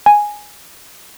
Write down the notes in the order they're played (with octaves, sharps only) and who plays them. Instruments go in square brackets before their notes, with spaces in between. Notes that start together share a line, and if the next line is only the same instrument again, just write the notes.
[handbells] G#5